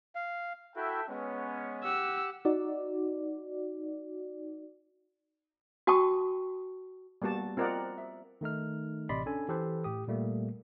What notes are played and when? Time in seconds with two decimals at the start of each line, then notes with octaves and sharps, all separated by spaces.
0.15 F5
0.76 E4 F#4 A4 E5 G5
1.09 G#3 B3 C#4
1.84 G4 F#5 E6
2.45 D#4 F#4 D5
5.87 F#4 G5 A5 C#6 D#6
7.22 G3 A#3 B3 F#4 A5
7.57 C4 F4 A#4 D5 D#5 F#5
7.98 E5
8.41 D#3 A3 D#4 F6
9.09 A1 C3 D5 D#5 B5 C6
9.26 C#4 D4 A4 G#5
9.49 E3 G4 A4 B4 C5
9.84 A2 G4 D#6
10.07 A#2 G3 A3 A#3